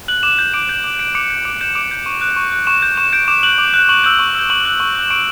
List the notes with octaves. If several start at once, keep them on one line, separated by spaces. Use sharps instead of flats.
F#6 F#7
D6 E7
G6
D6 D7
G6 E7
D6
G6 D7
D6 C#7
G6
D6 D7
G6 E7
D6 D7
G6
C#6
F#6
C#6
F#6
C#6 E7
G6
C#6 E7
G6 D7
D6 E7
F#6 F#7
D6
F#6
C#6 F#7
E6 G6 F#7
C#6
E6 G6
C#6 F#7
F#6
C#6
F#6
E7
C#6 D7